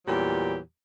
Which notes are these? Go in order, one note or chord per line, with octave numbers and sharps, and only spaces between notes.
E2 A#2 F#3 G3 G4